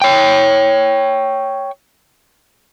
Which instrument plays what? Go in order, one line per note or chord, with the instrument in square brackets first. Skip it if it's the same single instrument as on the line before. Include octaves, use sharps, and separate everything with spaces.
[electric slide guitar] C#5 G5